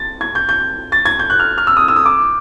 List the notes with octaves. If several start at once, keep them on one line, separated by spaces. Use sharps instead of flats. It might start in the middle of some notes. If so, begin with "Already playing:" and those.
Already playing: A6
G#6
G6
G6
A6
G#6
G6
F#6
F6
F6
E6
D#6
E6
D#6
D6